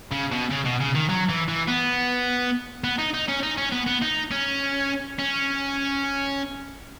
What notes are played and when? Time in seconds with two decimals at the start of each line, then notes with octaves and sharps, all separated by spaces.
0.12 C#3
0.32 B2
0.51 C#3
0.65 B2
0.81 C#3
0.95 D#3
1.10 F#3
1.29 E3
1.49 E3
1.68 B3
2.84 B3
2.99 D#4
3.14 D#4
3.29 C#4
3.43 D#4
3.57 C#4
3.72 B3
3.87 B3
4.02 D#4
4.31 C#4
5.19 C#4